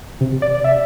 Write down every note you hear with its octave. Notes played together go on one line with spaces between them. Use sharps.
C3
D5
E5